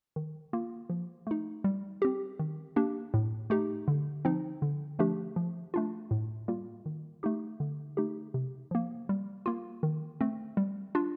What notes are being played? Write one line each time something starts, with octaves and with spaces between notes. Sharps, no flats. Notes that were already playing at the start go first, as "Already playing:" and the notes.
D#3
A#3 F4
F3
A3 D#4
G3
C4 G4
D#3
A#3 D4 G4
A2
A3 D#4 G4
D3
F3 C4 D#4
D3
F3 A3 D4 G4
F3
A3 D4 F4
A2
G3 A#3 F4
D#3
A3 D#4 G4
D3
A3 D#4 G4
C3
F3 A#3
G3
A#3 F4
D#3
A3 C4
G3
D4 F4